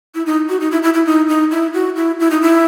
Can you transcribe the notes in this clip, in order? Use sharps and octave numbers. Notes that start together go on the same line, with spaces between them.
E4
D#4
F#4
D#4
E4
E4
E4
D#4
D#4
E4
F#4
E4
E4
D#4
E4